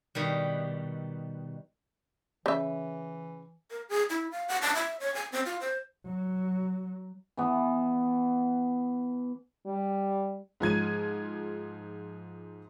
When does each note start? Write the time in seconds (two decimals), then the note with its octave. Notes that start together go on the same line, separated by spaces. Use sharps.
0.15 B2 D#3 G3
2.46 C#3 E3 E5
3.71 A#4
3.89 G#4
4.10 E4
4.32 F5
4.48 F#5
4.62 A5
4.75 E5
5.00 C#5
5.15 G#5
5.32 C4
5.46 F4
5.61 C5
6.05 F#3
7.37 E3 B3
9.66 G3
10.60 G#2 F3 G#6 D#7